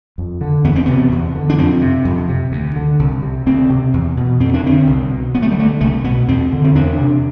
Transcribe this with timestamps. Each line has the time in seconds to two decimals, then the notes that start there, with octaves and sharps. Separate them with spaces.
0.18 F2
0.41 D3
0.64 E2 B3
0.75 C4
0.86 C3 B3
1.12 E2
1.35 D3
1.50 D4
1.58 F2 C4
1.82 C3
2.05 F2
2.29 C3
2.52 D2
2.76 D3
2.99 C2
3.22 C3
3.46 D2 C4
3.70 C3
3.93 E2
4.17 B2
4.40 F2 C4
4.54 D4
4.63 D3 C4
4.87 C2
5.10 B2
5.34 D2 B3
5.42 A3
5.51 G3
5.58 D3 A3
5.81 C2 A3
6.04 B2 B3
6.28 E2 C4
6.52 D3
6.64 C4
6.75 E2 D4
6.99 C3